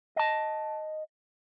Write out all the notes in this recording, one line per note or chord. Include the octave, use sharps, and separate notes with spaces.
D#5 A5